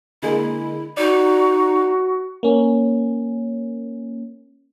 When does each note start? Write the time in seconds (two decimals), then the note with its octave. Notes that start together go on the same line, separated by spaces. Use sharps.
0.23 D3 G#3 A#3 E4
0.97 D#4 F#4 D5
2.43 A#3 C#4